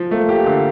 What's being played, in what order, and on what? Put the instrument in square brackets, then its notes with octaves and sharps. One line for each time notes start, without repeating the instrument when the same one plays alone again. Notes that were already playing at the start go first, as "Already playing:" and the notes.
Already playing: [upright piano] F3
[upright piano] A3 [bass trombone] A#3
[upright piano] G4
D3